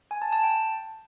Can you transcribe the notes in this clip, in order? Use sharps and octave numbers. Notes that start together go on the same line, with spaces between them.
G#5
A5
A5
G5